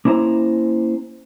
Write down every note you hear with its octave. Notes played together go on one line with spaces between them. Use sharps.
A#3 C#4 E4 C5 G#5 A#5